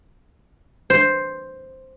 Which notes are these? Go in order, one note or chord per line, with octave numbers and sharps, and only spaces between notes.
C5